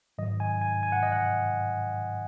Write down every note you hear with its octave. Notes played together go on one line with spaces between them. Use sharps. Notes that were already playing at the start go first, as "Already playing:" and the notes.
G#2 D#3 F#3 D#5
G#5
G#5
G#5
F#5
D#5
F#5